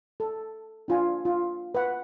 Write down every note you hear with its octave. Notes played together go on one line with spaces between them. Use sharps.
A4
D4 F4 G#5
F4
B4 F#5